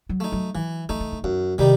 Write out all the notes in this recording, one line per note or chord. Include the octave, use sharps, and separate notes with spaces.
F#3
A3 D#4
F#3
E3 F#3
E3 A3 D#4
D#3
E3
F#2 D#3
C3 D#3 G3 D#4